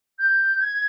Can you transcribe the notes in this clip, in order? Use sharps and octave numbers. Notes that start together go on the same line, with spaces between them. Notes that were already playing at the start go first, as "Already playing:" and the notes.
G6
G#6